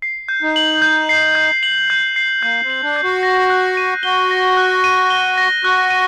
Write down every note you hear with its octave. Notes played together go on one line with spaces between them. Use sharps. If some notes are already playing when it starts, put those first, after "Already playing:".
C7
G6
D#4
F#7
G6
C7
G6
F#7
G6
C7
A#3 G6
C4
F#7
D4
G6
F#4
A#6
F#6
D#7
F#4 G7
A#6
F#6
D#7
G7
A#6
F#4 F#6
D#7